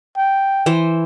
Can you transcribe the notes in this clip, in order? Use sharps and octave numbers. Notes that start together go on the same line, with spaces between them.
G5
E3 C5